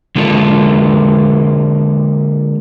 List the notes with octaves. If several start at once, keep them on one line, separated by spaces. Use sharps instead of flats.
D3 G#3 A#3 D#4 F4 A4